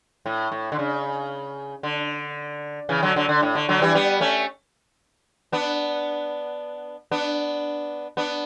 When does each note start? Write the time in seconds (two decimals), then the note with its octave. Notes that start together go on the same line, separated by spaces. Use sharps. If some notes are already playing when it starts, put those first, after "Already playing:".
0.26 A2
0.52 A2
0.72 D3
0.79 C#3
1.83 D3
2.89 C#3 E3
3.03 D3 F#3
3.16 D3 F#3
3.29 D3
3.43 A2
3.55 D3
3.69 D3 F#3
3.82 E3 G3
3.94 G3 B3
4.21 A3 C#4
5.52 B3 D4
7.11 B3 D4
8.17 B3 D4